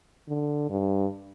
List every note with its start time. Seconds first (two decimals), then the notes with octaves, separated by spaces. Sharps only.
0.28 D3
0.69 G2